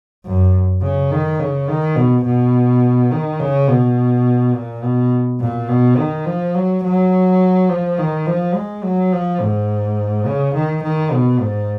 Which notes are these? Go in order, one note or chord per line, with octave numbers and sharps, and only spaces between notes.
F#2
C#3
D#3
C#3
D#3
B2
B2
D#3
C#3
B2
A#2
B2
A#2
B2
D#3
F3
F#3
F#3
F3
D#3
F3
G#3
F#3
F3
G#2
C#3
D#3
D#3
B2
G#2